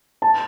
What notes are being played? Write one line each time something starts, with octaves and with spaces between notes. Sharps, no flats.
A5